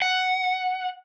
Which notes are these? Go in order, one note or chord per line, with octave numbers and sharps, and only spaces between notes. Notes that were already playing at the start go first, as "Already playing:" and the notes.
F#5